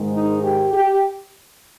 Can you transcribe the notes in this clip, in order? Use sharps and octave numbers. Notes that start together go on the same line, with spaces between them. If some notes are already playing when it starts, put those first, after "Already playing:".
Already playing: G#2 D#3 G#3
D#4
G4
G4